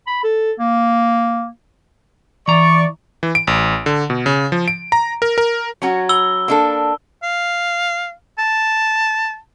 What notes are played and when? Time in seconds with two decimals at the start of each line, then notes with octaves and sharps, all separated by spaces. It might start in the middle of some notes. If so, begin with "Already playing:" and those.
0.07 B5
0.24 A4
0.59 A#3
2.48 E3 D5 A#5 C#6
3.23 E3
3.35 D7
3.47 A1
3.86 D3
4.10 B2
4.26 C#3
4.52 F3
4.68 D7
4.92 A#5
5.22 A#4
5.38 A#4
5.82 F#3 C#4 F#4
6.09 B5 E6 G7
6.48 A#3 D4 A4
7.23 F5
8.38 A5